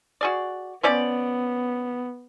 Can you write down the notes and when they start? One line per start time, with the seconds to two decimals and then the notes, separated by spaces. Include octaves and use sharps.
0.21 F#4 G#4 D5
0.83 F3 B3 C#4 D5